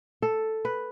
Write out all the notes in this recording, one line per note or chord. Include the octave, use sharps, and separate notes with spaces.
A4
B4